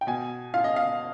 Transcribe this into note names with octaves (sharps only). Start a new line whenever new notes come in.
G5
B2 G#5
F4 F5
D#5
F5